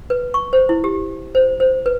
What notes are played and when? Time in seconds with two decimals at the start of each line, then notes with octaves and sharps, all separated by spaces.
0.10 B4
0.34 C#6
0.53 C5
0.69 E4
0.84 G4
1.35 C5
1.60 C5
1.86 B4